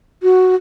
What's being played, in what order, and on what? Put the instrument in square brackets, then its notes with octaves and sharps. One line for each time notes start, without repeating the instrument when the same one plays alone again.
[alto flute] F#4